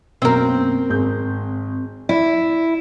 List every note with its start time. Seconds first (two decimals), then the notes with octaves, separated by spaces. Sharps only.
0.22 F#2 B2 A#3 C4 A#4
0.90 G#1 G#4 G6
2.09 E4 D5